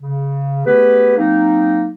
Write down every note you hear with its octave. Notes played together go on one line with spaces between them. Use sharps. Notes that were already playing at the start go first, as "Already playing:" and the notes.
C#3
A3 B3 G4 G#4 B4
F#3 A#3 C4 D#4